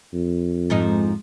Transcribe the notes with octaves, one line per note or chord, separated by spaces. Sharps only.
F2
G#2 F3 D#4